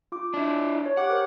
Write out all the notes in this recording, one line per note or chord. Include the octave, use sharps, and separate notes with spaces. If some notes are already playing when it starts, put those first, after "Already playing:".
F4 D6
D4 E4
C#5
G4 F#5 D6 F#6
A#4 C5